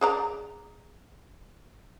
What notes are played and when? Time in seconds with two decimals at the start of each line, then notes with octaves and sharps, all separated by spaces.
0.01 G#4 D5 A#5